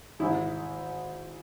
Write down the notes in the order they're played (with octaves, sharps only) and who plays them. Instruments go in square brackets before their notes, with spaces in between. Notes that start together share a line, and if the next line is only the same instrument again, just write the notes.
[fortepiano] G#1 G#2 G#3 E4